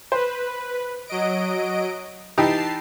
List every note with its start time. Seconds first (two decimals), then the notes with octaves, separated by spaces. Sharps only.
0.12 B4 C5
1.07 F#3 D#5 D7
2.38 E3 D#4 G4 A5 C7